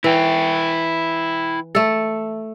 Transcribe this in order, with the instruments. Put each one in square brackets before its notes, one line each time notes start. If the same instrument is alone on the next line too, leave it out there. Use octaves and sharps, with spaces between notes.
[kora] E3 [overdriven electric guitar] E4 G5
[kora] A3 A4